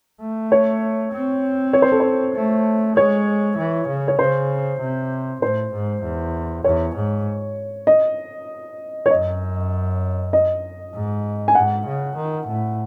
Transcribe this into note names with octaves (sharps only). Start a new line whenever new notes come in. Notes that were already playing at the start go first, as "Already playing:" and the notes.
A3
C#5
C4
C#5
C5
A4
C5
A3
G#3 C#5
E3
C#3
C#5
C#3 C5
C3
A2 C5
G#2
E2
E2 C#5
G#2
D#5
C#5
F#2 D#5
D#5
G#2
G#5
G#2 F#5
C#3
D#3
A2